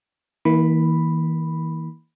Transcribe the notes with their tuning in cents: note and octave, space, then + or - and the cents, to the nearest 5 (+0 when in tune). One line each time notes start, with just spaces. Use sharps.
E3 -40 A#3 +0 B5 +0